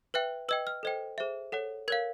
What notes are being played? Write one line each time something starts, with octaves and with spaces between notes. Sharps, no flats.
B4 E5 G5 F#6
B4 D#5 G5 E6
F6
A4 C5 D#5 G5
G#4 C5 E5
A4 C#5 F#5
A#4 C#5 F5 G#6